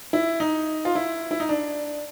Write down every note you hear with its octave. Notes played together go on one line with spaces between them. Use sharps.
E4
D#4
F4
E4
E4
D#4
D4